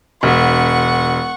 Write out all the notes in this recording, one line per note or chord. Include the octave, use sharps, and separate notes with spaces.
E1 F#5 C#6